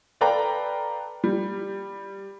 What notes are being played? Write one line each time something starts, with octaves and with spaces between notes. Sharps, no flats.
A4 B4 D5 F5 G5 A#5
G3